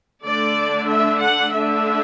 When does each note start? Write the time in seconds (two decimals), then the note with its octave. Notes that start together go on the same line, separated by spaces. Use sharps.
0.23 D3 A3 D4 D5
0.88 E5
1.20 F#5
1.53 D3 A3 D4 E5